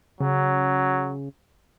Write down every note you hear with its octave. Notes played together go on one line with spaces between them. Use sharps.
C#3 F#3